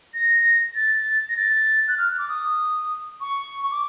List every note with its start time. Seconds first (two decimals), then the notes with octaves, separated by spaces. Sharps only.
0.14 A#6
0.75 A6
1.29 A#6
1.37 A6
1.88 F#6
1.98 F6
2.18 D6
2.29 D#6
3.21 C#6
3.71 D6